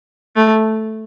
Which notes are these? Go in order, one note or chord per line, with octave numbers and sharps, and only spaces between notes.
A3